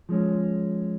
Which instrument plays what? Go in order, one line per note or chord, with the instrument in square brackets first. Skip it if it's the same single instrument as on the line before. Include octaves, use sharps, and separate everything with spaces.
[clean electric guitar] F3 G#3 C#4